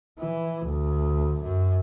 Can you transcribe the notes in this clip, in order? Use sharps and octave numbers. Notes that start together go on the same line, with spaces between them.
E3
D2
F#2